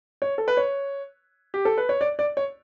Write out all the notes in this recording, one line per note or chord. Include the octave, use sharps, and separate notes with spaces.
C#5
A4
B4
C#5
G4
A4
B4
C#5
D5
D5
C#5